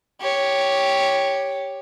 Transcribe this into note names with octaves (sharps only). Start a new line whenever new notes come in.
G4 C#5